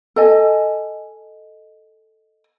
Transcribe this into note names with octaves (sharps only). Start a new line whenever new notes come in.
A4 D#5 G#5